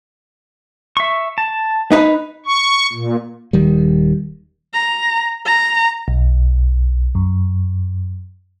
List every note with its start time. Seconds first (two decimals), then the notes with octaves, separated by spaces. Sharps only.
0.97 E5 C#6
1.38 A5
1.92 D#4 B4
2.46 C#6
2.92 A#2
3.53 D#1 D#3 G3
4.73 A#5
5.45 A#5
6.08 B1
7.15 F#2